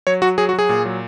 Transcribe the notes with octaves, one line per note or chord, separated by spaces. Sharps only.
F#3 C#5
F#3 F#4
F#3 G#4
F#4
F#3
G#4
A#2
F#3